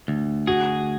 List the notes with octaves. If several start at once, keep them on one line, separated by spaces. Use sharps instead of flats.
D2
F#4 G#4